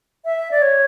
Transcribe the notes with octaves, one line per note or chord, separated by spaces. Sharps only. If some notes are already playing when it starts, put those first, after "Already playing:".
E5
D5
C#5